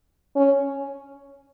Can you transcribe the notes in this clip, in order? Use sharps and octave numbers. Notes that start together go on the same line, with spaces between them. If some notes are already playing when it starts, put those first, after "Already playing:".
C#4